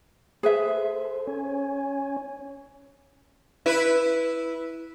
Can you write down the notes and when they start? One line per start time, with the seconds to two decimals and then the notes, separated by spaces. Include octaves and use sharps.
0.43 G#4 A4 B4 C5 E5
1.27 C#4 C#5 G#5
3.66 E4 B4